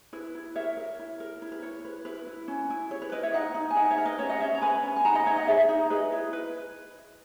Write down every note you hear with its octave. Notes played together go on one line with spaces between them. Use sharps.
E4 B4
E4
A#4 C#5 E5
A#4
E4
A#4
E4
B4
E4 C#5
B4
E4 B4
E4
C#4
E4
E4 C#5
B4
E4 B4 D#5
C#5 E5
D#4 D#5 F#5
D#4
G#5
D#4 D#5 F#5
C#5 E5
A#4
B4 D#5
C#4 C#5 E5
D#5 F#5
C#4 C#5 E5
A#5
B4 G#5 B5
C#4
G#5
D#4 F#5 A#5
D#5 F#5
D#4 C#5 E5
D#5 F#5
G#4 C#5 E5
D#4
G#4 B4 D#5
E4
B4